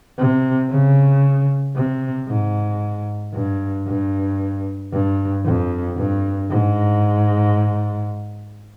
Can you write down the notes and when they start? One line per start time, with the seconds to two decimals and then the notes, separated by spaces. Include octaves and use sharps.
0.18 C3
0.70 C#3
1.75 C3
2.28 G#2
3.34 G2
3.87 G2
4.92 G2
5.45 F2
5.97 G2
6.51 G#2